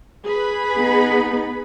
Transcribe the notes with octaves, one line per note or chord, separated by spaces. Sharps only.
G#4 B4 B5
B3 D#4